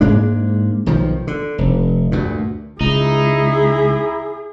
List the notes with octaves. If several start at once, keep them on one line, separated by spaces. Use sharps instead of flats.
G#2 G#3 A#3 D4
B1 D#3 F3
D3
F1
D2 G2 A#2
C#2 D#4 E4 G#4